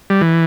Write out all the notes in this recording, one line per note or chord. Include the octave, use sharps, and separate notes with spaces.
G3
E3